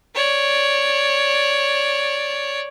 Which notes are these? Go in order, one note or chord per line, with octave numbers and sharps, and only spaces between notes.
C#5 D5